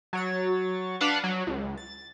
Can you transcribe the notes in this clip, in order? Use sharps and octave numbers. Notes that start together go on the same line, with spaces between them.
F#3 C#5 A6
D4 B4 F5 F#5
F#3
C#2
A6